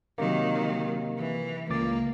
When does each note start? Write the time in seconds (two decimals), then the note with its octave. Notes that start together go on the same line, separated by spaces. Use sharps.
0.18 C3 D#3 F#3 A#3
1.18 E3
1.70 C#2 A#3 D6 A6